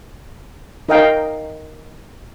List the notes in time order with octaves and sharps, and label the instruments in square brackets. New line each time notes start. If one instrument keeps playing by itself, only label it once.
[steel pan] D#4 A#4 D#5 F5 G5